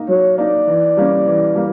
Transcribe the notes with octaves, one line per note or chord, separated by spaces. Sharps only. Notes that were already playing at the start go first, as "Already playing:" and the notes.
Already playing: A#3 D#4
F#3 C#5
A#3 D#4 D5
E3
G3 A#3 C#4
E3
G3 A#3